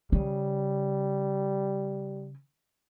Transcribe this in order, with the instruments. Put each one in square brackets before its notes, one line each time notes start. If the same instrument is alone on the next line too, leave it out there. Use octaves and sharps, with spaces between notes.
[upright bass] C#3 [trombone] G3